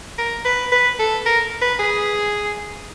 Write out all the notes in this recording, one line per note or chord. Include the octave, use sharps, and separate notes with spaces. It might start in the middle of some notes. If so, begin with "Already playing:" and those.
A#4
B4
B4
A4
A#4
B4
G#4